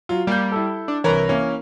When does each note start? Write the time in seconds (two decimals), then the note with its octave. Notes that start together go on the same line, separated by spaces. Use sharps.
0.09 F#3 F4
0.27 G3 A#3 G6
0.52 E4 A4
0.88 D4
1.04 C2 E3 A#4 B4 C#5
1.29 A#3 C#4